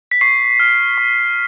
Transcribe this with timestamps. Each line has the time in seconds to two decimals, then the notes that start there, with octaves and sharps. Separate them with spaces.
0.11 B6
0.21 C#6 C7
0.60 F6
0.98 C#6